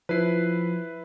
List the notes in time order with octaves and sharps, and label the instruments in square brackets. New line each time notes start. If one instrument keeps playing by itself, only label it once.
[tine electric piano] F3 C7 [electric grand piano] E4 B4